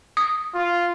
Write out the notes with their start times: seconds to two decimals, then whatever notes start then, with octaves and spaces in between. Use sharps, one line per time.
0.17 D#6
0.54 F4